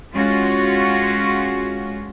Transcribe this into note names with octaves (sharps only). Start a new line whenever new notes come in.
G#3 C#4 F4 F#4